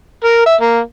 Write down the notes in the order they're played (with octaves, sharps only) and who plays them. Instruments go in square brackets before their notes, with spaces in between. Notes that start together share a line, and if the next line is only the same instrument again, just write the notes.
[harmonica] A#4
E5
A#3